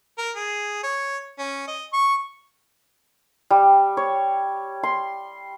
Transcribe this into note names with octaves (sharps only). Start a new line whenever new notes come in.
A#4
G#4
C#5
C#4
D#5
C#6
G3
C#5
C6